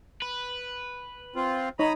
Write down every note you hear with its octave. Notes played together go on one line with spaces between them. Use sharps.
B4
C4 F4
D#4 C#5 A#5 B5 D#6